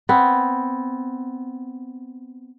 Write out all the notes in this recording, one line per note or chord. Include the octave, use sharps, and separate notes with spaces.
B3 C4